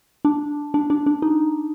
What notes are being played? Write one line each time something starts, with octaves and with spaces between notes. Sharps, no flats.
D4
D4
D4
D4
D#4